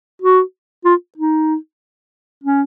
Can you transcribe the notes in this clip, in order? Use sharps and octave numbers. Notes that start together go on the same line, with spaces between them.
F#4
F4
D#4
C#4